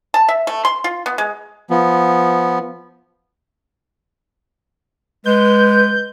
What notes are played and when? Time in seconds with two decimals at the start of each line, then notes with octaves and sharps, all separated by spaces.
0.14 A5
0.28 E5
0.47 A3
0.65 C6
0.84 F4
1.06 B3
1.18 G#3
1.70 F3 B3
5.26 G#3 B4 G6